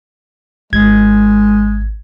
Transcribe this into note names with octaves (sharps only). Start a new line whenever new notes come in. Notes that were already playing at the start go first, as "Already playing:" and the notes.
G#1 G#3 G#6